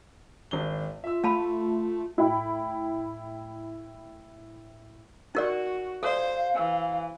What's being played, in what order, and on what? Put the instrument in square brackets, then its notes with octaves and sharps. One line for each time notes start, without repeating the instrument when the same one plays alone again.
[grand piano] G#1 D4 G7
[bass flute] F4 [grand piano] E5 E6
[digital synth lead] A3 [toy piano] F5 A5 B5
[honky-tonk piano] A2 E4 G5 B5
[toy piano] D#4 A#4 D5 [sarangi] F#4
[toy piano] A4 D5 [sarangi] C5 [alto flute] F5
[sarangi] E3